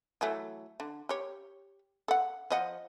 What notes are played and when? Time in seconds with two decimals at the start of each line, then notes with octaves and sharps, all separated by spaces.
0.21 E3 F#3 A3
0.80 D3
1.09 G4 C#5
2.08 A4 F#5
2.50 F3 D#5 F#5